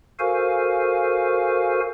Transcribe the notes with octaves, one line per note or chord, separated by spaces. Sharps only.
F#4 A4 A#4 C5 F5 G#5